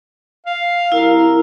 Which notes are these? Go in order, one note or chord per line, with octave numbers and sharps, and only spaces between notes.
F5
C2 E4 A#4